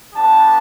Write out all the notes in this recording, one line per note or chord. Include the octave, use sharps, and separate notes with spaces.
B3 D4 G4 A5